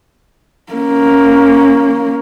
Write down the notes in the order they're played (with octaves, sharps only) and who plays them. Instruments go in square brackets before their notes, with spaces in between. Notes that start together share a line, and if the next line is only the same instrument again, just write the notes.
[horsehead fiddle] A#3 C#4